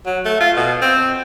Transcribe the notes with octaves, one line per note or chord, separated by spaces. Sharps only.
F#3
A3
F4
B2
C4